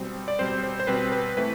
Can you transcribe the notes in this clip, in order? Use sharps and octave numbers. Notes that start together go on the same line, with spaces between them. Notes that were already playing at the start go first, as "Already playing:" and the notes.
Already playing: B2 G3 C4 C5
D5
B2 G3 C4 C5
C5
C5
B2 G3 C4 B4
B4
E3 A3 C4 B4